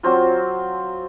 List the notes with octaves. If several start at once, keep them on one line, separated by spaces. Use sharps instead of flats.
F#3 C4 F4